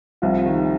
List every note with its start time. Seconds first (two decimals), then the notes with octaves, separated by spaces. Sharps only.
0.22 C2 F3 F4
0.45 D#3